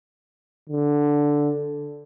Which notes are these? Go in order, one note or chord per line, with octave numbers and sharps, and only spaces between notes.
D3